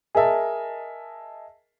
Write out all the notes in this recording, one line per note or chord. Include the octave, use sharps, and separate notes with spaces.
G#4 A#4 D#5 E5 A5